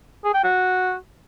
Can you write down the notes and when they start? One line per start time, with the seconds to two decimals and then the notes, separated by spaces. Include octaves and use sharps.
0.25 G#4
0.34 G5
0.44 F#4